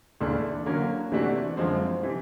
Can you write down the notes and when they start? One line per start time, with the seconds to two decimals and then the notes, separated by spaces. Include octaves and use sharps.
0.20 D2 C#3 E3 A3 D4
0.66 D3 F#3 A#3 C#4
1.12 C3 E3 A3 D4 F#4
1.57 F#2 D3 F3 G#3 C4
2.03 C3 E3